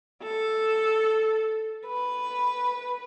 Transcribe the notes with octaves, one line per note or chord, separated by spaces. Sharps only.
A4
B4